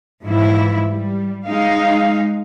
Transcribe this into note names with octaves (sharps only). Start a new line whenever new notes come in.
G#2 E3 F3 E4
G3
G#3 D#4 F5